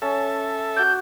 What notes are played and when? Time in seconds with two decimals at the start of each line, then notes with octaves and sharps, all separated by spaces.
0.02 C#4 A4 E5
0.76 F#4 D6 G6